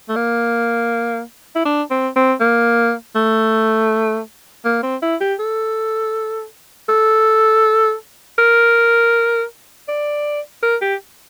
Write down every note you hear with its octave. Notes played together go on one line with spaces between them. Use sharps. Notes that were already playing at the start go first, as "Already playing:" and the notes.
A3
A#3
E4
D4
C4
C4
A#3
A3
A#3
C4
E4
G4
A4
A4
A#4
D5
A#4
G4